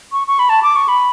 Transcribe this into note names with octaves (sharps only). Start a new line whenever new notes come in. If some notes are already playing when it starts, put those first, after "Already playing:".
C#6
C#6
B5
A5
D6
C#6
B5